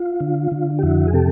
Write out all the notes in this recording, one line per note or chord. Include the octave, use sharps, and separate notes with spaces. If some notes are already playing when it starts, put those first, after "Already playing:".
Already playing: F4
D3
D3
G4
F2 E4 F#4
G#4
C3 G4 A4